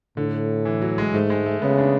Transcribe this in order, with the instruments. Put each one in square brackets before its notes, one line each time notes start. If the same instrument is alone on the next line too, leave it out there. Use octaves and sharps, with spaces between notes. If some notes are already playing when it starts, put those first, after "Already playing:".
[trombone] A2 [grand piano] D3
[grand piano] E3
F#3
G#3
[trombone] G#2 [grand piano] A3
[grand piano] G#3
A3
[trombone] C#3 [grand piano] B3
[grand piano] D4